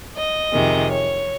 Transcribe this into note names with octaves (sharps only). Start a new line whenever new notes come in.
D#5
F2 C3 D#3 G#3
C#5